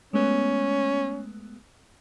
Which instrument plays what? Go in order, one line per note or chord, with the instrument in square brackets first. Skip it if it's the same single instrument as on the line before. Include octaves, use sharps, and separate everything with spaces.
[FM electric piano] G#3 A3 B3 [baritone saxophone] C#4